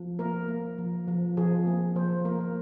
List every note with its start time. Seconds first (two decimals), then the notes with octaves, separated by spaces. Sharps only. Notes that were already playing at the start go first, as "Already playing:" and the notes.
Already playing: F3
0.19 A#3 A#4
0.48 A#3
0.78 F3
1.08 F3
1.37 F3 G#4
1.67 A#3
1.95 F3 C5
2.25 A#3 A#4